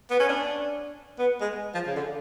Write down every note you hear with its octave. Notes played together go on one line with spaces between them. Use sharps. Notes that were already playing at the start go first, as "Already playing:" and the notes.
B3
C#4
D4
B3
G#3
F3
C#3
D3